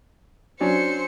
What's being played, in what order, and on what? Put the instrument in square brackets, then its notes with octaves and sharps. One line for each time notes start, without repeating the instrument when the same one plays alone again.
[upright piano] F#3 C#4 D4 [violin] C5 C#7